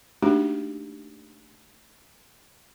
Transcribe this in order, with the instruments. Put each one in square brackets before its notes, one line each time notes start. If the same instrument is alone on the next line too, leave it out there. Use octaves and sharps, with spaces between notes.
[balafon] A3 A#3 D4 D#4 F#4 G4